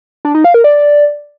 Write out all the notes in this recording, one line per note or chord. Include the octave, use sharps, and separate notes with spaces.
D4
D#4
F5
A#4
D5